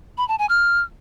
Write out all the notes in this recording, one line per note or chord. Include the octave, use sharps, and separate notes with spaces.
B5
A5
G#5
F6